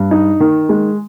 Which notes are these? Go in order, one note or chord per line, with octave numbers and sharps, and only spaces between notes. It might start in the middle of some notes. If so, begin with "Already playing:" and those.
Already playing: G2
D#4
D#3
G#3